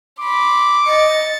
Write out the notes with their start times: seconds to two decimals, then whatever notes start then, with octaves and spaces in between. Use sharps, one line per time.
0.20 B5 C6 D6
0.87 D#5 A6 C#7